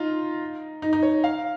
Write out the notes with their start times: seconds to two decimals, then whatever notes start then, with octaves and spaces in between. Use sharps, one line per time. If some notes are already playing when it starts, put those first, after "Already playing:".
Already playing: D#4 F4
0.82 D#4
0.93 D#4
1.03 C#5
1.24 F5